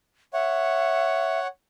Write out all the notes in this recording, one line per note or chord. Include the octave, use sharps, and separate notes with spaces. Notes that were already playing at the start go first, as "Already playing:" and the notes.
C#5 E5 F#5